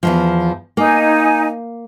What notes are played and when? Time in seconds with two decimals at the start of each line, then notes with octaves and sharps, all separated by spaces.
0.03 E2 G#2 F3
0.77 A#3 D#4 G#5